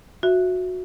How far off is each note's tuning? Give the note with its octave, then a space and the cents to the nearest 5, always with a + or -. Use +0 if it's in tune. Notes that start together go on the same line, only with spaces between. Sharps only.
F#4 -15 E5 +10